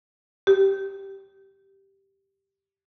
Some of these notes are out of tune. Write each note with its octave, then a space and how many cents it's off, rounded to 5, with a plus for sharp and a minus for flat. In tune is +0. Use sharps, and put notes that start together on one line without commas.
G4 -5